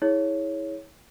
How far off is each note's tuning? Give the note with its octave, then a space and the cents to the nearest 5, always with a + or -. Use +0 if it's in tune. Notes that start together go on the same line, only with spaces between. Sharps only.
E4 -30 G#4 +0 C#5 +0